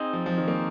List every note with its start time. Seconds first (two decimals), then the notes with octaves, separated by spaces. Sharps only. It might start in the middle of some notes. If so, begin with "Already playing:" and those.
Already playing: C4 D#4 G#4 C5
0.13 F3
0.26 F3
0.38 D#3
0.48 A#3